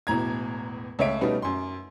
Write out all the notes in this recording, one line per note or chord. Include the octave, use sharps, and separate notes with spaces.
E1 E2 A2 A#5 G#6
C#2 A3 C#5 E5 D7
B2 G3 A3 B3 C#4 D#4
F#2 C6